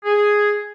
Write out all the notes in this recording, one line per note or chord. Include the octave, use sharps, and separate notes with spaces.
G#4